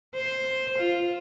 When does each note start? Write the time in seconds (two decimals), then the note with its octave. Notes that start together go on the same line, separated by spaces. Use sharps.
0.15 C5
0.78 F4